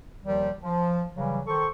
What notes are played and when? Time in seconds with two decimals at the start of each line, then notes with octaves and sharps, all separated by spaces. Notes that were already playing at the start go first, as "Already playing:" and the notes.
0.23 D#2 D#3 F3 G3
0.63 F3
1.15 C#3 E3 F#3 G3
1.47 D#3 A4 C5 C#6